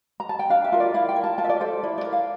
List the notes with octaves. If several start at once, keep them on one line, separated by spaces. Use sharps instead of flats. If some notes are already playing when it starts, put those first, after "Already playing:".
A#5
A5
G5
D4 F5
E5
F4 A#4
D5
E4 F5
G5
A#4
A5
F4 A5
E5
D5
A4 C5
E4 D5
D5
A#4
F5